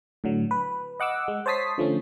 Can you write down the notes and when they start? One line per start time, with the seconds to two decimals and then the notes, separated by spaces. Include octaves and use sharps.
0.24 A2 D3 F#3
0.51 B4
1.00 D#5 F#5 D6 E6
1.28 G#3
1.46 C5 C#5 A5 D#6 B6 C7
1.78 D3 F3 A3 C#4